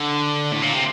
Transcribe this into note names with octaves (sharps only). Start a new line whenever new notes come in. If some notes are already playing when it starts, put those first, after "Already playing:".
Already playing: D3
A2
A#2
C3